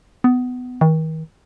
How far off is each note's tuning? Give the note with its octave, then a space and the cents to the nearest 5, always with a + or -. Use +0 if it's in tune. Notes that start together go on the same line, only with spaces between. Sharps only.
B3 +20
D#3 +40